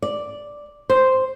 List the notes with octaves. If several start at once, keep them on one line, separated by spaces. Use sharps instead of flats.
D5
C5